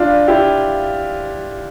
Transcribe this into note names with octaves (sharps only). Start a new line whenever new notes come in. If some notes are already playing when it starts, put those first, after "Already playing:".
Already playing: D4 F4
E4 G4